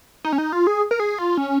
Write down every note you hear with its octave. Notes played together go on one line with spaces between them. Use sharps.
D#4
C#4
D#4
F4
G#4
A#4
G#4
F4
C#4